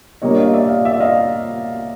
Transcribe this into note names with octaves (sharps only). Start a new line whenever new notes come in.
A#2 G3 A#3 D4 C#5 D#5
D#5 F5
D5 E5
D#5 F5
D5 E5
D#5 F5